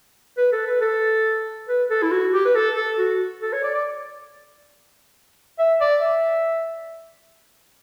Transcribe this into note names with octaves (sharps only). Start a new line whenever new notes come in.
B4
A4
B4
A4
B4
A4
E4
F#4
G4
B4
A4
A4
F#4
A4
C#5
D5
D5
E5
D5
E5